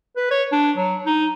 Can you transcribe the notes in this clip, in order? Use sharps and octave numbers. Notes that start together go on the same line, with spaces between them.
B4
C#5
D4
F#3
D#4